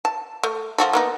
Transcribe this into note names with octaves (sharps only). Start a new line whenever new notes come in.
A5
A3
F3 F#4 A4
A#3 B3 D#4